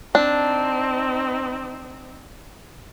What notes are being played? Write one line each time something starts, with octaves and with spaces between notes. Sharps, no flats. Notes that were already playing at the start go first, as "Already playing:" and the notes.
C4 D4 D#4